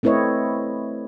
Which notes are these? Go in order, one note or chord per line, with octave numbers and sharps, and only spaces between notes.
A3 C4 E4 B4 C#5 D#5